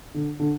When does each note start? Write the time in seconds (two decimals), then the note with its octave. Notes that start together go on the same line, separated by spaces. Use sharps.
0.14 D3
0.40 D3